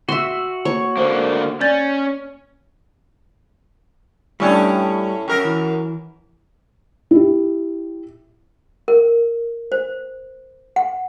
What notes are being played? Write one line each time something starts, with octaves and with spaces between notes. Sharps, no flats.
F#4 E5 C6
A#3 C#5
D3 A#3 C5
C#4 D5 G6 A6
A2 G3 A3 C#4 D4
F#2 A#4
E3
E4 G4
A#4
C5
F#5